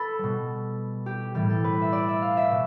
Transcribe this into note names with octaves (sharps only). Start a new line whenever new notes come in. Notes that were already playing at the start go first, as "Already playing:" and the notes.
Already playing: A4 B4
B2 G3
G4
A2 E3 G3 G4
A4
B4
E5
D5
E5
F5
E5
B2